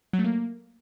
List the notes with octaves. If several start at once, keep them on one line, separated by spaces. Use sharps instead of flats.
F#3
A3
A#3